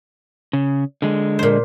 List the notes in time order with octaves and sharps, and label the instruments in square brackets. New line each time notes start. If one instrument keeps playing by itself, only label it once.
[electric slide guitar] C#3
D3 G#3
[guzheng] A#2 C5